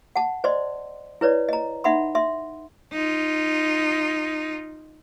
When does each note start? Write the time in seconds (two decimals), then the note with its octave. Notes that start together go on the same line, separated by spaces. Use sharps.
0.16 F#5 A5
0.44 C5 D5 D#5 C6
1.21 E4 B4 C#5 D5
1.49 D#5 A#5
1.84 D#4 E5 F#5 B5 C6
2.15 E5 C6
2.93 D#4 F4